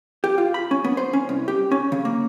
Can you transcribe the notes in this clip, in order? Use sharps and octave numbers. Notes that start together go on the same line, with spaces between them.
G4
F4
B5
C#4
B3
C5
C#4
C2
G4
C#4
C#3
A#3